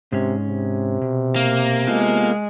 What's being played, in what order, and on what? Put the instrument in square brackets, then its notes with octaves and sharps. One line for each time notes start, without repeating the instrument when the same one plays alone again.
[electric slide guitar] G#2 G#3 C#4 [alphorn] C3
[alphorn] C3
[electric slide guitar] B2
[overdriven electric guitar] A#3
[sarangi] G#3 [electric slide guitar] B3 F4 A4